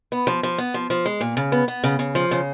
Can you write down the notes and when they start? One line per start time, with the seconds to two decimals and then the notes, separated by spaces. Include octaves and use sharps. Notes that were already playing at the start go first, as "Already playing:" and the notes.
0.12 B3
0.27 F3
0.43 F3
0.58 B3
0.74 F3
0.90 F3
1.06 G#3
1.21 A#2
1.37 C#3
1.52 B3
1.68 B3
1.84 C#3
1.99 C#3
2.15 F3
2.31 C#3